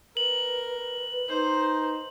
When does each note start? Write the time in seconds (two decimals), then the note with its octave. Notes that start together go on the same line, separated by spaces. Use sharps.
0.17 A#4 B4 F#7
1.29 D#4 C5